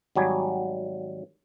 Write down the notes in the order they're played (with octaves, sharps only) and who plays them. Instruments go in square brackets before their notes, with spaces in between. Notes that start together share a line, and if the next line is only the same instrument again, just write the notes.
[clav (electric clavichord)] G#1 F#3 G3 G#5